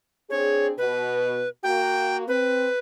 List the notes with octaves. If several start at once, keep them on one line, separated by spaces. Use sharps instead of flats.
C4 D4 G#4 C#5
B2 B4
A#3 F#4 G5
C4 B4